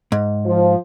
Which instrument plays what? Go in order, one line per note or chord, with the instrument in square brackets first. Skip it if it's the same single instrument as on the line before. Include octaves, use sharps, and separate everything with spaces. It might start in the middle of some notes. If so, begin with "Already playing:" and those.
[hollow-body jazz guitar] G#2
[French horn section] F3